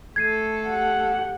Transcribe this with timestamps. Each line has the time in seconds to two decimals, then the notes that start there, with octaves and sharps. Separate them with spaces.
0.16 A3 A4 G#6 C7 D#7
0.68 G4 F#5